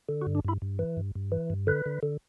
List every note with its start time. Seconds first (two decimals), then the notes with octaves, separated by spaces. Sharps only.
0.09 D3
0.22 F#4
0.27 G2
0.35 D4
0.45 G2 E4
0.62 G2
0.79 E3
0.97 G2
1.15 G2
1.32 E3
1.50 G2
1.67 D3 B4
1.86 D3
2.03 D3